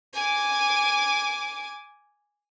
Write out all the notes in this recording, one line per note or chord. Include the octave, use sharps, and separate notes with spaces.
G#5 D6